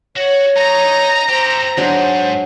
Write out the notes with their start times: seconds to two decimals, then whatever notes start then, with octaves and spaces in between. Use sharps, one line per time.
0.17 F#4 C#5 F#5
0.56 D#4 A#5
1.29 G4 A4 C5
1.77 G#2 F#3 D4 G#4